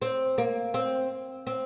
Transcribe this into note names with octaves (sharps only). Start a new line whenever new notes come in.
C4
A#3
C4
C4